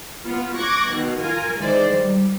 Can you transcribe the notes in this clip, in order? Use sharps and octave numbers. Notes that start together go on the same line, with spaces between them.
B3 F4
C#6 D6 F#6 G#6 A#6
B2 D#3
F4 A#4 G#5
G#2 D#3 E3 C5 D5
G3